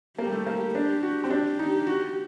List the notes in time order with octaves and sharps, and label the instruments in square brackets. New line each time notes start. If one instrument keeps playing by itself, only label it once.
[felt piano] A#3 [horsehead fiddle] G4
[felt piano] G3
A3
A#3
[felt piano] D4 [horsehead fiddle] G4
[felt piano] F#4
C4
[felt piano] D4 [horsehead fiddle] G4
[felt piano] D#4
F#4